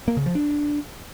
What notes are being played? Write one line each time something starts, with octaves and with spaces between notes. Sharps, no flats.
A#3
C#3
F3
D4